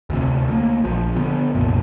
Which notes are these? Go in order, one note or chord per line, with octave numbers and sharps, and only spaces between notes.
D2 C3
D2 A#3
A#1 F3
D3 B3
C2 F#2 A#2